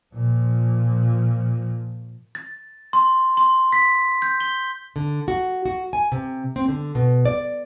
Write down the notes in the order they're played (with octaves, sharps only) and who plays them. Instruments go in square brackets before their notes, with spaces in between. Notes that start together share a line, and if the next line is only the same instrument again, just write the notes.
[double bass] A#2 F3
[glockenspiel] A6
C6
C6
B6
G6
G7
[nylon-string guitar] D3
F#4
F#4
G#5
C3
C4
D3
B2
D5